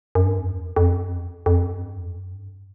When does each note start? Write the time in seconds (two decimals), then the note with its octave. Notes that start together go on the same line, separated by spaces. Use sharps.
0.15 F#2
0.25 G2
0.38 F2
0.51 E2
0.64 F2
0.76 F2
0.94 F#2
1.11 F2
1.46 F2
1.64 F#2
1.80 G2
1.98 F2
2.16 F#2
2.33 G2